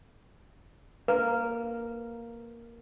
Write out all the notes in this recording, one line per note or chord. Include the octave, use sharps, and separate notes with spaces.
A#3 B4